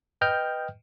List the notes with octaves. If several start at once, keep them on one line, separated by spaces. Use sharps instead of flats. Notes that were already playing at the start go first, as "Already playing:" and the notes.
B4 D#5 G5 F6 G6